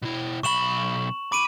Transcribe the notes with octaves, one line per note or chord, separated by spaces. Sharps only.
B2 E4
B1 B5 C#6 E7 F#7
B5 D6 D7 D#7